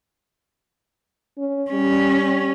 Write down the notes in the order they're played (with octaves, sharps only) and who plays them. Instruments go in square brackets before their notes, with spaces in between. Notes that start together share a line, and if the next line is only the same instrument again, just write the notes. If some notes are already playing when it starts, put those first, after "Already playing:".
[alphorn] C#4
[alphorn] G3 [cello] C#4